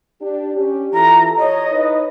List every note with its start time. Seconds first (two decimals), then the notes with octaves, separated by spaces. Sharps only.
0.21 D4 G4
0.56 C#4 G4
0.94 E3 F4 A4 A#5
1.38 C#5 D#5
1.71 D#4 E4 B4